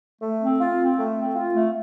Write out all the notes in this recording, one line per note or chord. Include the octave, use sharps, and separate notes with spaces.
A3
C4
F4
C4
A3
C4
F4
A3